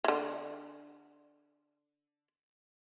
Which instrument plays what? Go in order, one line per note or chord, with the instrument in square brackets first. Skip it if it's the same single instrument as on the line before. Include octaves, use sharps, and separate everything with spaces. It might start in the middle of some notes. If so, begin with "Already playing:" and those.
[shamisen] D3 E3